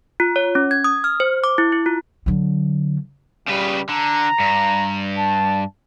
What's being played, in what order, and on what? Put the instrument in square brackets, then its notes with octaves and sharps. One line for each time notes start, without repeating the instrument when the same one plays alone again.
[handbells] F4
C#5
C#4
G#6
D#6
F6
C5
D6
E4
E4
F4
[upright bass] D3 F#3
[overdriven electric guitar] C#3 B4 [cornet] G3
[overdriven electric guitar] D3 [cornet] A#5
[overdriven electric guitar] G2
[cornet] A5